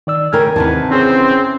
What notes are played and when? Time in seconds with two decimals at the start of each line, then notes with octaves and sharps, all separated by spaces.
0.07 D#3 D5 E6
0.33 C#3 C#4 A#4 G5 G#5 F6
0.56 D#2 C3 D#3 E3 B3 A5
0.91 C4 C#4 G#4 C5